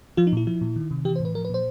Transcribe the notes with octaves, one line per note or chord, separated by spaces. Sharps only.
F3 F4
D#4
A#2 E4
F3 E4
A#2
D#3
C3
E3 G4
C5
A2 B4
F3 A#4
B4
A#2 C5